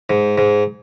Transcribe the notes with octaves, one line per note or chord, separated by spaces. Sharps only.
G#2
G#2